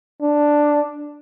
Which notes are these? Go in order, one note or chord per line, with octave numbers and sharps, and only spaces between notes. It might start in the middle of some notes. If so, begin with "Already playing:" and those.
D4